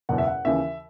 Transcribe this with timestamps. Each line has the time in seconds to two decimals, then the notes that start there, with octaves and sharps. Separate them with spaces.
0.09 F#1 E2 B2 F#5
0.18 E5
0.27 F#5
0.45 D#2 C#3 E3 E5